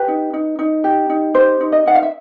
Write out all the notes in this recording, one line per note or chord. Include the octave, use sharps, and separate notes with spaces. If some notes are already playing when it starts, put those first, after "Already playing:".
Already playing: G4 B4
D#4
D#4
D#4
G4
D#4
G4 C5
D#4
D#5
D#4 F#5
F5
E5